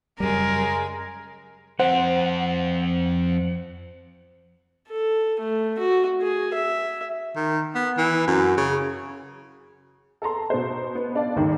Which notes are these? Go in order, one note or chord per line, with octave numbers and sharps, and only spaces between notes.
F#2 C#3 G3 G#3 A#4
F2 C4 C5 F#5
A4
A3
F#4
G#4
E5
D#3
B3
E3
F#2
C#3
A4 A5 A#5 C6
B2 C5
B3
D4 D5 F5
G1 D#2 G#2 D#3